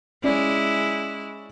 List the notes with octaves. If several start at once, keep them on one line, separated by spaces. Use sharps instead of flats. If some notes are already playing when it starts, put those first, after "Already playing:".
G#3 C#4 E4 D5